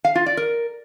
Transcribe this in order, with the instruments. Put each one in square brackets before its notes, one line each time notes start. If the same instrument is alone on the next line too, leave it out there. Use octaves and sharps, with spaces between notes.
[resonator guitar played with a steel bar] F5
F4
D5
A#4